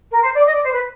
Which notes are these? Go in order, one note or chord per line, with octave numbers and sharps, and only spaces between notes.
A#4
C5
D5
D#5
D5
C5
B4